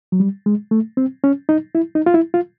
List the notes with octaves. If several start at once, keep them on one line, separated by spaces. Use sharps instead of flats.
F#3
G3
G#3
A3
C4
C#4
D#4
E4
D#4
F4
E4
F4